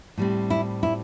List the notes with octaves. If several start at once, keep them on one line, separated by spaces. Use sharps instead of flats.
A2 G3 C4
E4
E4